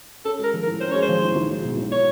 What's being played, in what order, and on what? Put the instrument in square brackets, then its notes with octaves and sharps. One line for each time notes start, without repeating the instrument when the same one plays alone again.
[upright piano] C#4 [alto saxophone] A4
[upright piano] G#3 [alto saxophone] A#4
[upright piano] F3
[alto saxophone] A#4
[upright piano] A2
[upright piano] C#4 [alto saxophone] C5
[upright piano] G#3 [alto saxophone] C#5
[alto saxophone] C5
[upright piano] F3
A2
B1
G#3
B2
B1
[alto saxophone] C#5